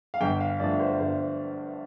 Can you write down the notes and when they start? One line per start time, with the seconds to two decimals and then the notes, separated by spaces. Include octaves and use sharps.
0.14 F5
0.20 G1 G5
0.41 F5
0.60 G2 F3 A3 D4 D5
0.80 C5
0.99 G1 C5